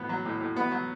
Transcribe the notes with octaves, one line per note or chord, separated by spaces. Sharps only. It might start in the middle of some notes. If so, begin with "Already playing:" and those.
Already playing: A2 B3
F#3
A2
A2
B3
F#3